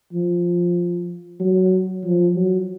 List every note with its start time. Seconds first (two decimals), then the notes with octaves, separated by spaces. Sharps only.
0.13 F3
1.40 F#3
2.04 F3
2.36 F#3